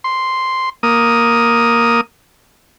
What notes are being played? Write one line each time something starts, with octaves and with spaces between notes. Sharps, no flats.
C6
A#3 D#6